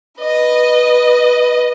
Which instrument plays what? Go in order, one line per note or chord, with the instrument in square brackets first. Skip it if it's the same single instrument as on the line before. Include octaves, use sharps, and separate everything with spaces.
[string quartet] B4 D#5